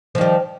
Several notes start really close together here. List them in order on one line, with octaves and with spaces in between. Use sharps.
F3 D#3 G3